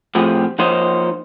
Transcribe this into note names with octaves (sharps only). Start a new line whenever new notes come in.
A2 F3 A3 C4 G4 G#4
F3 A#3 D#4 C5 C#5 D#5